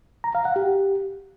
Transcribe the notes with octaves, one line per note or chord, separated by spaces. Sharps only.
A#5
F5
F#5
G4